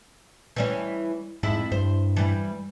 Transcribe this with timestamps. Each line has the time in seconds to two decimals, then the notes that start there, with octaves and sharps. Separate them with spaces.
0.56 E3 G3 C#4
1.43 F2 G#2 E4
1.72 G2 C5
2.17 E3 G3